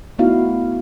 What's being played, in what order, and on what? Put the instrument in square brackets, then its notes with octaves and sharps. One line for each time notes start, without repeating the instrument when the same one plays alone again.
[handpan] A3 B3 D#4 E4 F#4 F5